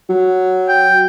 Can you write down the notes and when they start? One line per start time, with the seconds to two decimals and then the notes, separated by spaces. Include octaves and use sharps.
0.09 F#3
0.69 G5